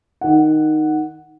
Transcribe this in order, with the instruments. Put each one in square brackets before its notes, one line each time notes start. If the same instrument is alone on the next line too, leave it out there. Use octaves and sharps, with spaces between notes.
[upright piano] D#3 F#5